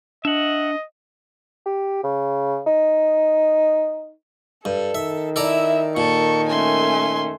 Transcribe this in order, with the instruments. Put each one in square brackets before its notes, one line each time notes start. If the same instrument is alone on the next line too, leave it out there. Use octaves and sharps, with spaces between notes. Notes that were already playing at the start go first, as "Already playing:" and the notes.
[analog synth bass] D4 [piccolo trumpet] D#5 [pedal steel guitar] E5 F#5
[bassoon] G4
C#3
D#4
[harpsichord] G2 [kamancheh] A4
[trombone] D#3 [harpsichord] E5
[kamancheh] E4 E5 [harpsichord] A4 D5 A#5
[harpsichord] A#2 [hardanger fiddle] A4 [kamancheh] C#6
[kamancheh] A3 C#4 [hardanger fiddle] G#5 C6